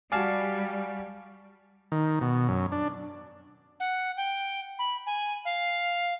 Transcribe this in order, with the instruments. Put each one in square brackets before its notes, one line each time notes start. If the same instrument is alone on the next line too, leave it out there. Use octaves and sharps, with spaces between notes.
[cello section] G3 [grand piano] F#4 G#5 [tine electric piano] D5 F5 A5
[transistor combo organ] D#3
B2
F#2
D4
[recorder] F#5
G5
B5
G#5
F5